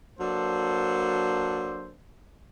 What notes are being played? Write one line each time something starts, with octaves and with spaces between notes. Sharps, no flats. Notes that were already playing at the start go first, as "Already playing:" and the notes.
F#3 A#3 D4 A4 C5